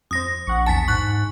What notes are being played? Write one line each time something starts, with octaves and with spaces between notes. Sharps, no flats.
F2 C5 D#6 A#6
A#1 F#5 C#6
E2 G#5 A5 A6 B6
G#2 C#6 F#6